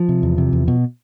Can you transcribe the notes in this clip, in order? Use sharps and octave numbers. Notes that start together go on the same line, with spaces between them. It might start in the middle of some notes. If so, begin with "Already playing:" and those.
Already playing: F3
C3
E2
C3
E2
B2